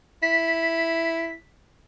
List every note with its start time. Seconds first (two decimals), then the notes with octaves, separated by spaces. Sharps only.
0.22 E4 B6